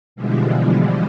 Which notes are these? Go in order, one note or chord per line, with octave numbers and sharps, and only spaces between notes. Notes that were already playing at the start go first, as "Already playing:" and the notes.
B2 D3 E3 F3 G3 G#3